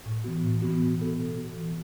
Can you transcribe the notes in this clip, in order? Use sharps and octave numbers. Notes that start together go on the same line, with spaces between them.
A2
E3 B3 F#4
A2
E3 B3 F#4
B2
B3 F#4 A4
B2
B3 F#4 A4
E3